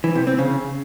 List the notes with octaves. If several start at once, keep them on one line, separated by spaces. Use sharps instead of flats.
E3
C3
C4
C#3